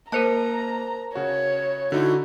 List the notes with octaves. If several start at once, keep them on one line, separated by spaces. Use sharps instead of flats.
A#3 A#4 C5 D#5 A5 A#5 F#6
C#3 F#4 C#5
D3 D#4 E4 F#4